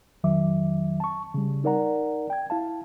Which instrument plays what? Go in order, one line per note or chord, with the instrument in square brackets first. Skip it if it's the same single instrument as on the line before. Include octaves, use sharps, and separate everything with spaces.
[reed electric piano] F2 D#3 F#3 E5 D6
A5 C#6
C#3 G3
D#4 A#4 D5 F#5 A#5
G5 G#6
E4 F5 A5